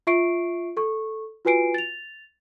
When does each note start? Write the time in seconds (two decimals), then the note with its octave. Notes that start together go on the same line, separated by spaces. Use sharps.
0.07 F4 E5 C#6 C7 D7
0.77 A4 C#6
1.45 F4 F#4 B4 G#5 C7 D7
1.74 A6 F7